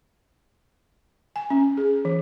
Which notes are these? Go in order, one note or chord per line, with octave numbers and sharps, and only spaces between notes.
G#5
C#4
G#4
E3